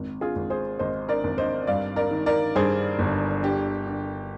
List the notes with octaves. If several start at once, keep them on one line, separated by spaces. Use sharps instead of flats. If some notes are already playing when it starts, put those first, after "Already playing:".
Already playing: G#1
F4 G#4
G#1
G#4 C5
G#1 C5 D#5
A#4 D5
G#1
C5 D#5
G2 D5 F5
A#4 D5
D#3
A#4 D5
G2 G#4 C5
G1
D3 G4
D3